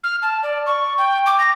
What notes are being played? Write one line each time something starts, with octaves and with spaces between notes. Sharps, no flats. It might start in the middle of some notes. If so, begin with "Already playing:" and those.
F6
A5
D5
C#6
G5
D6
A#6